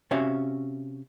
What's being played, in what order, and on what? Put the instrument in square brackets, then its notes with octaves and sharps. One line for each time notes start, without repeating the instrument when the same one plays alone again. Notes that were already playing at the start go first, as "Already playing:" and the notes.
[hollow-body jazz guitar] C3 C#4 F#4 E5 F5